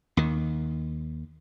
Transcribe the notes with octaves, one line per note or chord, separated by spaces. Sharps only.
D#2 D#3